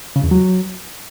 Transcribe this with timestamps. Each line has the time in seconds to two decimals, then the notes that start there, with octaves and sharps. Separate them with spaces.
0.16 C#3
0.24 E2
0.31 F#3